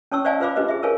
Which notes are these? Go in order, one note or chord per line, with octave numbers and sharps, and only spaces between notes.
C#4 C#5 A5 C#6 E6
C5 D5 D#5 F5 G#5 A5
F4 B4 C5 F5 B5 D6
D4 G4 B4 C5 D#5
G#4 E5
A#4 B4 C#5 F5 G#5